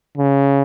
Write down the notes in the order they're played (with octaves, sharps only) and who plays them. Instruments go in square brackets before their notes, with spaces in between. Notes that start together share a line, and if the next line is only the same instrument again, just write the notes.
[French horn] C#3